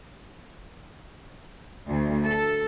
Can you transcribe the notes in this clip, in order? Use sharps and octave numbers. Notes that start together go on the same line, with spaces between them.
D2
A4